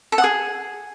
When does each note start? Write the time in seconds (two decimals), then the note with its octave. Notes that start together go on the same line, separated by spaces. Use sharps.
0.12 A4
0.18 F#5
0.24 G#4